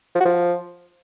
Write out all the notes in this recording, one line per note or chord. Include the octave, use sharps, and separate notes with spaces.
F3
F#4
F3